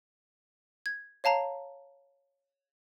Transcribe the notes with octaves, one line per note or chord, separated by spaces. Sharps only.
G#6
C#5 F5 A5 A#5 C7